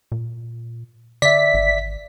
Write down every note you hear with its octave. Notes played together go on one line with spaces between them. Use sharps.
A#2
D3 D5 E5 B6
G#1